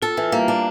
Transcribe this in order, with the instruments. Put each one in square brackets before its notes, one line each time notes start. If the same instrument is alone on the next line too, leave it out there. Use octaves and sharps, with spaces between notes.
[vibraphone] F4 [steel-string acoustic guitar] A4
[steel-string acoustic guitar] E3
[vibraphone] F4
[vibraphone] G3 G4 [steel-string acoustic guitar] A#3
[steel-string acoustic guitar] D4